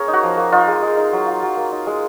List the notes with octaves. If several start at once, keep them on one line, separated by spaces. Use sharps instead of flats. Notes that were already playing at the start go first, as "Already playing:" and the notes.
Already playing: A#3 C#4 G#4 A#4 C#5
D#4
F#4
F3
A#3
D#4 F4
G#3
G#3
D#4
F#3
F4
F#3
A#3
D#4
G#3